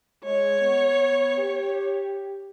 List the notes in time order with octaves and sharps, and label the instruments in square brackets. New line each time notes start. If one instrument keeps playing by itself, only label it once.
[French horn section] G#3 [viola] C#5
[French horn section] B3
G4